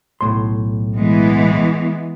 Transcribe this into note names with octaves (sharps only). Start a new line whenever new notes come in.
B1 A2 C6
E3 G#3 B3